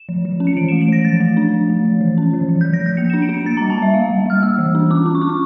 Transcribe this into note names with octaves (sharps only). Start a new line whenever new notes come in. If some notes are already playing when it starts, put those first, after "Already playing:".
Already playing: E7
F3
F3
C#4
C#7
E3 D7
A3 E7
D7
E3 A#6
F3 A6
A3
D4
F3
A3
F3
E3
C#4
E3
F3
F3 G6
A#6
F3 G6
A#3 C#7
D4 E7
D7
D4
C#7
A#3 A6
G3 A#5
A5
G3 E5
A#3 F5
G3
G3 F6
A#3 E6
E3
D4
C#4 D6
C#4
C#6
C#4 D6
C#6